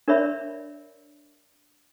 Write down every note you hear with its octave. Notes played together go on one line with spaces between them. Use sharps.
D4 A#4 C#5 D5 E5 B5